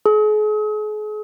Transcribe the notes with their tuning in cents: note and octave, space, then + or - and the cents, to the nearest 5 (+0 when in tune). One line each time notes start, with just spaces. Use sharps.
G#4 +40